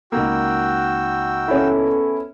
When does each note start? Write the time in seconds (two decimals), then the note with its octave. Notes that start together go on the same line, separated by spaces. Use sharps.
0.12 C#2 D#3 A#3 F#4 G5 E6
1.48 E2 C#4 E4 A4